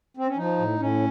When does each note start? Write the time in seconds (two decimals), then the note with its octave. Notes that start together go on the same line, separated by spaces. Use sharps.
0.17 C4
0.27 C#4
0.37 F3 D#4
0.58 A2
0.79 A2 C#4